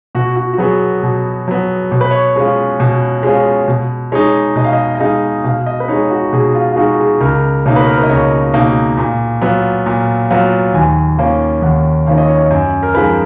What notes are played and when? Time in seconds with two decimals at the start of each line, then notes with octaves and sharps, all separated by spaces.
0.15 B2 F#4
0.36 F#4
0.54 F#4
0.58 F#3 B3 G#4
1.03 B2
1.48 F#3 B3
1.92 B2 C#5
2.01 B4
2.11 C#5
2.36 G#3 C#4 F4
2.80 B2
3.23 G#3 C#4 F4
3.68 B2
4.12 G#3 D#4 C#5
4.55 B2 D#5
4.64 F5
4.73 D#5
4.95 D#5
5.00 G#3 D#4 F5
5.44 B2 F5
5.66 D#5
5.80 B4
5.88 G#3 D#4 C#5
6.11 F#4
6.32 B2 G#4
6.55 F4
6.72 F4
6.76 G#3 D#4 F#4
6.99 G#4
7.21 C#2 A#4
7.66 B2 A#3 D#4 C#5
7.76 B4
7.86 A#4
7.97 B4
8.03 D#5
8.09 C#2 C#5
8.54 B2 A#3 D#4
8.98 A#2
9.42 F#3 B3 F4
9.86 A#2
10.31 F#3 B3 F4
10.74 D#2 G#5
11.18 D#3 A#3 C#4 F4
11.62 D#2 F#5
12.06 D#3 A#3 C#4 F4 F5
12.18 D#5
12.29 C#5
12.38 D#5
12.50 F#2
12.83 A#4
12.94 F3 G#3 D#4 B4